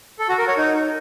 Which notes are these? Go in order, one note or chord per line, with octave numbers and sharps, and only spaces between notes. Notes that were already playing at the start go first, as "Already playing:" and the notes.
A4
F#4
A#4
C#5
D#4